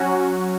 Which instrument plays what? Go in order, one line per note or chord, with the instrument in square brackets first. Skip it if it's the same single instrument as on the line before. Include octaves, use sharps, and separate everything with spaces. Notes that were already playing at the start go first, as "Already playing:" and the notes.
Already playing: [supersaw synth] F#3 C#4 F#4